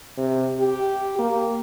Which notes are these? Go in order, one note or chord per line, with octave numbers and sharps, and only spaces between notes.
C3
G4
A#3